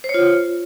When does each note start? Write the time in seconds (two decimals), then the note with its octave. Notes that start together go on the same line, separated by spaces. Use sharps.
0.04 C5
0.09 C#5
0.14 F4